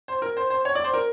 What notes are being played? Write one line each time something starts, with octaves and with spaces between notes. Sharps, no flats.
C5
A#4
C5
C5
C#5
D5
C5
A#4